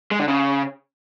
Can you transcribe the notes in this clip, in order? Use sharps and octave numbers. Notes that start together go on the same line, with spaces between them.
G#3
D3
C#3